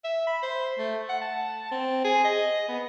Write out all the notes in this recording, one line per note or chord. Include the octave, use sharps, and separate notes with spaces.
E5
B5
C5
A3
F#5
A5
C4
G#4
D#5
B3